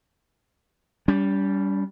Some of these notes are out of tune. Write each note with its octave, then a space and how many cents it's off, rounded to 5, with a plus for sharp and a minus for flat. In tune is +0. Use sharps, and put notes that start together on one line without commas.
G3 +0 C#4 +45